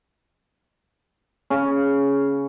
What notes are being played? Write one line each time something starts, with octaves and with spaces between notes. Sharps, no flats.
C#3 C#4